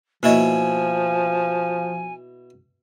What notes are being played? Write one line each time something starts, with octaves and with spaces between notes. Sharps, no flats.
B2 F3 A#3 E4 C#5 D#5 G#5